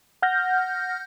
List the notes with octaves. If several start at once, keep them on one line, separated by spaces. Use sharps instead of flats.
F#5 F6 G6 A#6